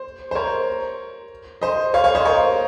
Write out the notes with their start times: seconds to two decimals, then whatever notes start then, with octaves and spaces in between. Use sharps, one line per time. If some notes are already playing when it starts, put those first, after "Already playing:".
Already playing: C5
0.31 C5
0.35 A#4 C#5
1.62 C5 D#5
1.94 C#5 F5
2.04 C#5 F5
2.15 C5 D#5
2.25 A#4 C#5